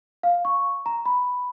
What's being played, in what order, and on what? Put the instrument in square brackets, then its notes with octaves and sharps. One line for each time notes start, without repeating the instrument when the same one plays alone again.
[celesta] F5
C#6
A#5
B5